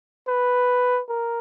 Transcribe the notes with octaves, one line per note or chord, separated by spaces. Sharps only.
B4
A#4